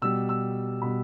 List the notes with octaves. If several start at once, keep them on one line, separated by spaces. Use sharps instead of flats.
B2 G3 E6
E6
B2 G3 B5